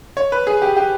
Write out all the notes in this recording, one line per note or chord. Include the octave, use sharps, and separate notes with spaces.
C#5
B4
G#4
G4
G4